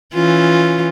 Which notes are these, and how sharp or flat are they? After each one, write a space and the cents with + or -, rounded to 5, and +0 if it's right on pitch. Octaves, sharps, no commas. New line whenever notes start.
E3 +0 C#4 +0 F4 +0